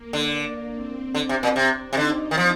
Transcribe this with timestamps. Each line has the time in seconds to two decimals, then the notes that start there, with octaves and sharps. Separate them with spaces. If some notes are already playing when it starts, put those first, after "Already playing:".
Already playing: A#3
0.13 D3
0.74 C4
1.15 D3
1.29 C3
1.43 A#2
1.56 C3 C4
1.93 C3
1.97 D3 D#4
2.31 D#3
2.38 F3